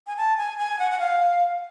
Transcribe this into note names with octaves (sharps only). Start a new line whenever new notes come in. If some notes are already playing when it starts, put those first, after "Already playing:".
G#5
A5
G#5
G#5
F#5
F#5
F5